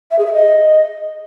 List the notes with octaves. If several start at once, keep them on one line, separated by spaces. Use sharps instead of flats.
E5
G#4
E5
D#5